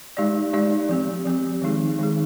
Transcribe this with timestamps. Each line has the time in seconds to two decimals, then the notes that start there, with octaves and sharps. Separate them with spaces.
0.17 G#3 D#4 G4 D5
0.53 G#3 D#4 G4 D5
0.89 F3 C4 G4
1.25 F3 C4 G4
1.62 D#3 G#3 D#4 G#4
1.99 D#3 G#3 D#4 G#4